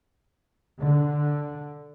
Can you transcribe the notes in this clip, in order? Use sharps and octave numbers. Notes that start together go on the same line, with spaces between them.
D3